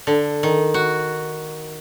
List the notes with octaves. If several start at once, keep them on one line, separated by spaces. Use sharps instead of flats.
D3
D#3
F#4